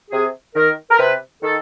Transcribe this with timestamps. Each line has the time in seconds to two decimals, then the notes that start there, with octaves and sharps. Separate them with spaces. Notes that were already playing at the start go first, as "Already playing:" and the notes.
0.11 C3 G#4
0.55 D#3 A#4
0.91 A#4
0.99 C3 B4
1.43 D#3 A4